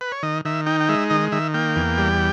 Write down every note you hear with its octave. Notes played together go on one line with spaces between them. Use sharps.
B4
C#5
D#3 D#5
D#3 E5
D#4 G5
G5
G#3 E5
D#3 D#5
D#3 E5
A#3 G5
E2
G3